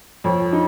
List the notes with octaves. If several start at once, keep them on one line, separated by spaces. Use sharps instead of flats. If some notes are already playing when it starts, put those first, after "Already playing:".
F2 F3 C#5
D#4